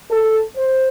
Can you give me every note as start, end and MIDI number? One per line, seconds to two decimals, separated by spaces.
0.10 0.39 69
0.56 0.88 72